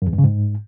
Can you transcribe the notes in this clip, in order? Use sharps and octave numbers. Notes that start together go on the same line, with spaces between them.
F#2
E2
G2
C#3
G#2